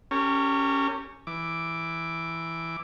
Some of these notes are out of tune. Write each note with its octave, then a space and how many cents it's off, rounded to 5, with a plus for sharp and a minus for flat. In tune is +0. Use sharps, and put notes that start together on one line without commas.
C#4 +0 G4 +0 A#4 -40
E3 +0 D6 +0